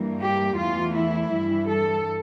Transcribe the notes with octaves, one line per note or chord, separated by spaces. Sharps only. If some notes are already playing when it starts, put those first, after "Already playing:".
Already playing: G2 E3 G3 A#3
G4
E2 E3 A3 F4
E4
G2 E3 G3
A4